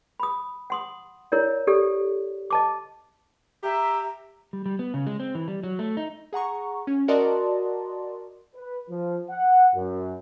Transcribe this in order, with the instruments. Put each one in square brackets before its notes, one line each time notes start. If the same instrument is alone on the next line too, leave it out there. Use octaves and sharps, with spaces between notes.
[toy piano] B5 D#6
F#5 C6 D#6
E4 A#4 C#5 D5
G4 A4 D5
D#5 A5 D6
[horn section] G4 E5 [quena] A#5
[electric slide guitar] G3
G3
B3
C#3
G#3
C4
E3
G3
F#3
A3
D#4
[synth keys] G#4 F#5 A#5 C#6
C#4
F#4 A#4 D5 D#5 A5 C6
[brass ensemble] B4
F3
F#5
F#2